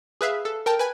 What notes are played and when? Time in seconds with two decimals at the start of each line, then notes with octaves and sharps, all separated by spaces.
0.21 G#4 B4 E5 F5
0.45 A4
0.66 A#4 G5 A5
0.79 B4 G#5